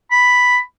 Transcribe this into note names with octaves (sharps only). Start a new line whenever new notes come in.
B5